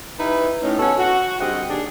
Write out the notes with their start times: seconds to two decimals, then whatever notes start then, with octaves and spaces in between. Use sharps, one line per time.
0.19 D#4 E4 G4 B4
0.62 A2 C#4 D#4
0.79 B3 C#4 F#4 A4 B4 C#5
0.98 F#4
1.39 D3 G3 G#3 C4 D#5 F#5
1.69 D#2 D4 G4 G#4